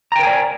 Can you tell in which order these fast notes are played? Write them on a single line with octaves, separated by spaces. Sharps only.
A#5 G5 A#4 G#5 D5